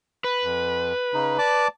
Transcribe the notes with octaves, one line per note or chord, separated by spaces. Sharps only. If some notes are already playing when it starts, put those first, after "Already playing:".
B4
F2
C#3 D#4
D5 A5 D6